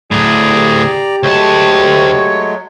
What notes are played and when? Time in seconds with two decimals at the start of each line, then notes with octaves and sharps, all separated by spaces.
0.11 D2 A2 G#4 D5 A#5
0.51 G4
1.23 D2 F#3 G#3 A3 C#5 A5